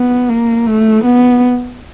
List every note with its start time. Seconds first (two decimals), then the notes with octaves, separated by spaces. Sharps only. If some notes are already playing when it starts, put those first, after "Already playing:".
Already playing: B3
0.29 A#3
0.67 A3
1.04 B3